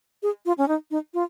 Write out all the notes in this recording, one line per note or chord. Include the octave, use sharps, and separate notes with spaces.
G#4
F4
C#4
D#4
D#4
F4